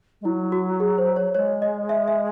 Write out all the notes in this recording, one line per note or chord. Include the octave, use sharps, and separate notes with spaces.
G#3
F#3 E4
F#4
G#4
C5
C#5
G#3 C#5
D#5
E5
E5